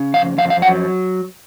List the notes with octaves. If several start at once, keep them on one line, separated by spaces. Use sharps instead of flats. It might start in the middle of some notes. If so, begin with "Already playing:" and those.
Already playing: C#3
F2 F5
F2 F5
F5
F#3 F#5